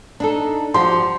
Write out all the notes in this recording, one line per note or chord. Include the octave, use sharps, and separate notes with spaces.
D4 D#4 A4
F3 F#4 G4 C6